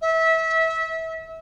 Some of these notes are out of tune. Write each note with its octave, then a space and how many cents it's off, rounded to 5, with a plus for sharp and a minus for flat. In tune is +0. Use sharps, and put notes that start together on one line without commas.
E5 -25